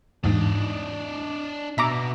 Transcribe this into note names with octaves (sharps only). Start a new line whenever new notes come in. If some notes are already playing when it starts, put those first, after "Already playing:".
E2 G#2 D4 D#5
B2 E5 A#5 D6